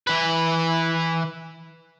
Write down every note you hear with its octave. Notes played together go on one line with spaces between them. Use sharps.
E3 B4